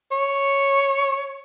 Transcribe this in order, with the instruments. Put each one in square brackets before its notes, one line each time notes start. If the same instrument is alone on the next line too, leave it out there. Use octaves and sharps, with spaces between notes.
[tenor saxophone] C#5